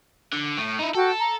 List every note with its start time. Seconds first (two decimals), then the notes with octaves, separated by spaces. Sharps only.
0.33 D3
0.58 A2
0.79 D#4 E4
0.95 F#4 A4 G5
1.18 A#5